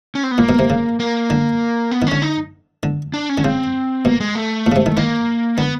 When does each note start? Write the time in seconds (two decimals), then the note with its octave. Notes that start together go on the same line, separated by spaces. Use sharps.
0.15 C#4
0.23 C4
0.31 B3
0.38 A#2 A#3
0.49 B2
0.59 C3
0.70 C#3
1.00 A#3
1.30 D3
1.91 B3
2.02 D#3
2.07 D3 C#4
2.22 D#4
2.83 D3
3.14 D4
3.29 C#4
3.38 D3
3.44 C#3 C4
4.04 B2 A#3
4.20 G#3
4.35 A3
4.66 A#2
4.72 C#3
4.76 C3
4.86 D#3
4.96 D#3 A#3
5.58 D3 B3